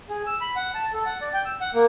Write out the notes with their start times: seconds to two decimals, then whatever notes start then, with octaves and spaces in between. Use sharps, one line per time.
0.10 G#4
0.26 E6
0.41 B5
0.56 F#5
0.75 A5
0.93 A4
1.06 F#5
1.21 D5
1.33 G5
1.45 E6
1.61 F#5
1.75 A#3